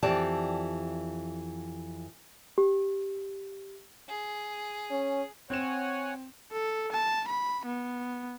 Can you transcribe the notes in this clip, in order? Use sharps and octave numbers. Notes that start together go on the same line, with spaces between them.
F2 E3 G4 D5 A5
G4
G#4
C#4
C4 C#5 F#5 G#5 E7
A4
A5
B5
B3